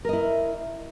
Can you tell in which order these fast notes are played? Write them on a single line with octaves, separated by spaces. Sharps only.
A#4 D#5 E4